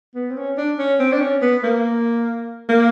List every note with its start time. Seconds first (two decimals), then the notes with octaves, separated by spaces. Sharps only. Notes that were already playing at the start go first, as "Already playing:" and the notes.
0.15 B3
0.31 C4
0.37 C#4
0.57 D4
0.79 C#4
0.99 C4
1.12 D4
1.20 C#4
1.42 B3
1.63 A#3
2.69 A#3